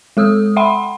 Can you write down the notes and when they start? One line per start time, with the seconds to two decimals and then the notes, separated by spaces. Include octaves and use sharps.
0.17 G#3 A4 D#6 E6
0.56 E5 F#5 G5 B5 C6